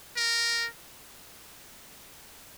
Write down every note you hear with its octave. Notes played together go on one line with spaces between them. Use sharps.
A#4